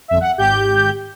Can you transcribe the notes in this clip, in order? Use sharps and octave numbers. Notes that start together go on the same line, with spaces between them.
G1 F2 E5
F#5
G#1 G4 G6